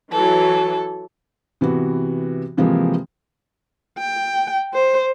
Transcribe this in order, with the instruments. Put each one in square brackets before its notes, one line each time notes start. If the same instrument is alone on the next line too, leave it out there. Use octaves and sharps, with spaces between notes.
[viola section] E3 F#3 [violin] A4
[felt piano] C3 E3 B3 F#4
C3 E3 F3 G#3 A#3 C4
[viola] G5
C5